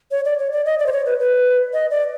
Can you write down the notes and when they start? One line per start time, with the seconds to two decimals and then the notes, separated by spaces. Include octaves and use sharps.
0.11 C#5
0.25 D5
0.39 C#5
0.52 D5
0.66 D#5
0.79 D5
0.86 C5
0.93 C#5
1.06 B4
1.19 B4
1.74 D#5
1.91 D5